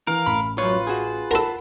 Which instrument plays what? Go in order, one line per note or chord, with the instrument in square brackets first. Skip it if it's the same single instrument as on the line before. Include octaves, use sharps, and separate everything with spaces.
[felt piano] E3 [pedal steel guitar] A#4 F5
[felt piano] A1 [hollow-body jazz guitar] B5
[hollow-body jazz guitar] F#2 C#5 [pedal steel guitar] F4 B4
[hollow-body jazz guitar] F#4 G#4
[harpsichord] A4 A#4 [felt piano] F#5 A5 B5